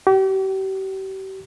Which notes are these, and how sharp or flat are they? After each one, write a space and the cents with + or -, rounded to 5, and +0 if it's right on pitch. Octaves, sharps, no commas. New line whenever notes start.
G4 -40